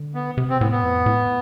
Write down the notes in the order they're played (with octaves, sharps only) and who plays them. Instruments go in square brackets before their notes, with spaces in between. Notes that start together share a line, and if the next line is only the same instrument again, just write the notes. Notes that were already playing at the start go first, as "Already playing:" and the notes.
Already playing: [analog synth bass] D3
[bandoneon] B3
[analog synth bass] C3
[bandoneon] C4
[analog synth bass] B2
[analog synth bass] A2 [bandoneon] B3
[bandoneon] B3
[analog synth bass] F2
A2